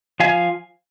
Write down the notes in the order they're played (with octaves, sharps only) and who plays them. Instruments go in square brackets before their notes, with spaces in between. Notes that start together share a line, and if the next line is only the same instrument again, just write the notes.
[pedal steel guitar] F3 F5 G#5